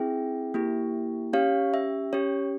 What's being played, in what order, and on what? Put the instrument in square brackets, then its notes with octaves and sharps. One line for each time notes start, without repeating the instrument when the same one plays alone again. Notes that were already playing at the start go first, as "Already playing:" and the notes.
Already playing: [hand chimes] C4 E4 G#4 E5 G5
A#3 E4 G4
C#4 G4 C#5 F5
E5
C#4 G4 C#5